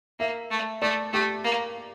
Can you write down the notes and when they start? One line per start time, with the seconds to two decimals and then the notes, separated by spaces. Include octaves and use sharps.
0.20 A#3 E5
0.51 A3
0.82 A3 D5
1.13 A3 G4
1.44 A#3